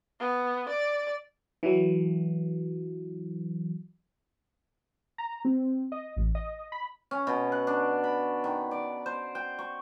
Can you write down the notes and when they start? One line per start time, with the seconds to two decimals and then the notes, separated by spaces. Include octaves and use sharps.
0.20 B3
0.69 D5
1.63 E3 F#3
5.18 A#5
5.45 C4
5.92 D#5
6.16 A1
6.35 D#5
6.72 B5
7.11 C#4
7.27 B2
7.52 F#5
7.67 D4
8.04 B5
8.44 D#3
8.71 D5
9.06 C5
9.35 G5
9.59 C#6